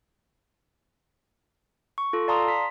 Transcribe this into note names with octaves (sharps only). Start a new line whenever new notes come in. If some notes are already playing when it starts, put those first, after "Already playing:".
C#6
F4 A4
D5 F5 A5 A#5 C6 D#6
B6